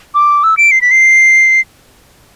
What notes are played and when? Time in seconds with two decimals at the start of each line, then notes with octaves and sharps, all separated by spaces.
0.15 D6
0.44 E6
0.57 D7
0.71 C7
0.81 B6
0.91 C7